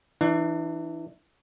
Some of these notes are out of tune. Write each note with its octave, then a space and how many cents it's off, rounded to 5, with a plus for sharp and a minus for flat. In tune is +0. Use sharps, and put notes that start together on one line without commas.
E3 +0 D4 +40